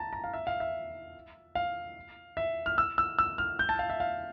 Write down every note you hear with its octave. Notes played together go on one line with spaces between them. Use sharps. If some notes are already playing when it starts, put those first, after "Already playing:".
Already playing: A5 A#5
A#5
F5
E5
F5
E5
F5
E5
F6
E6
E6
E6
F6
G6
A5
F5
E5
F5